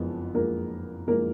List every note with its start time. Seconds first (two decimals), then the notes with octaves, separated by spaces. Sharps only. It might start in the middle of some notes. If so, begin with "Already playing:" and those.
Already playing: F#1 F2 F3 G#3 B3
0.35 F#1 F2 F3 G#3 A#3 A#4
1.07 F#1 F3 G#3 A#3 A#4